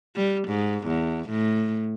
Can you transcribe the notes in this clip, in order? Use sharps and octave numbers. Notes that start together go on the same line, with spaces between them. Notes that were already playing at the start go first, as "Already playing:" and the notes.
G3
G#2
E2
A2